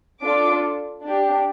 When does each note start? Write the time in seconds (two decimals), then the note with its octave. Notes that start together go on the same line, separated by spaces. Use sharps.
0.22 D4 F4 A4 D6
1.04 D4 G4